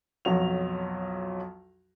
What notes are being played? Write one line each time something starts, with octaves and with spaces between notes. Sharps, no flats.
B1 F2 F#3 F#4 F7